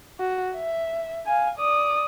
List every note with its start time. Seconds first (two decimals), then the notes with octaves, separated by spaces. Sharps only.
0.19 F#4
0.55 E5
1.26 F5 G#5
1.58 D5 D#6